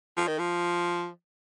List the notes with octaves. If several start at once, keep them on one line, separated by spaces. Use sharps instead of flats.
F3
D#3
F3